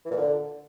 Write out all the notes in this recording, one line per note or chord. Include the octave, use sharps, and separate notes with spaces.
E3
A#2
D3